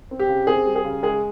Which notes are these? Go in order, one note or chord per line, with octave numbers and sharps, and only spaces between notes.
C4
G4
C#3
C4 G#4
G3
G#4
C#3
G#3 G#4